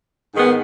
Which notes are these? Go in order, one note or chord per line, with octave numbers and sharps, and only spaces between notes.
G#2 D#3 G#3 B3